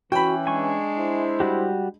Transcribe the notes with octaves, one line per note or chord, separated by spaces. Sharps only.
E3 C#4 F#4 G5 B5
G#3 D4 G#5 C#6
E4 C5
G3 F#4 G4